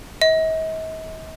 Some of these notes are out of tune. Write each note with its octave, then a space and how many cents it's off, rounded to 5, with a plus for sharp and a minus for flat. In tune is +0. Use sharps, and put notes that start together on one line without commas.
D#5 +45